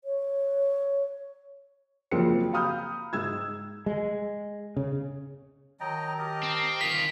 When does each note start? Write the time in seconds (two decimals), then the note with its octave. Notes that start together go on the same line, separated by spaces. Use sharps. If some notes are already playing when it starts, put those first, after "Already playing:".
0.04 C#5
2.11 F#1 C#3 F3 A#3 C4 C#7
2.53 F5 A#5 B5 D#6 F6 G6
3.13 G#2 E6 G#6
3.86 G#3
4.77 C#3
5.80 D#3 F#3 D#5 G5 A5 A#5
6.18 G4 A#4 D#5
6.43 C4
6.81 D#3 F4 B6